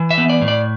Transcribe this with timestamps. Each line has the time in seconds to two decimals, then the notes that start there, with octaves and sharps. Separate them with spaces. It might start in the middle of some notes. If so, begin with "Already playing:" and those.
Already playing: E3
0.11 E5
0.18 B3
0.30 D5
0.42 A2
0.48 D5